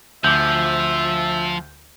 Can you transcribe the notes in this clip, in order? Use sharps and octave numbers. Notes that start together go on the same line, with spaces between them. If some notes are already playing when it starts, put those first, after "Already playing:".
D2 F3 E5 D6 G6